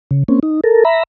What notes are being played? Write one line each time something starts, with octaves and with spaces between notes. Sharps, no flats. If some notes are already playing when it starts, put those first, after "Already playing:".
C#3
A#3 C4 C#4
D#4
A4 A#4
E5 A#5 B5